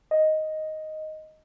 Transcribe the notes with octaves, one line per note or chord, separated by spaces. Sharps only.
D#5